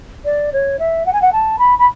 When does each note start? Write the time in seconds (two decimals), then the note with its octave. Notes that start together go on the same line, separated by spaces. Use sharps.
0.25 D5
0.52 C#5
0.79 E5
1.06 F#5
1.13 G#5
1.22 F#5
1.32 A5
1.58 B5
1.78 B5